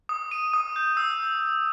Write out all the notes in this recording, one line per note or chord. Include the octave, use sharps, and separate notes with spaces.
D#6
D#7
D#6
G6
E6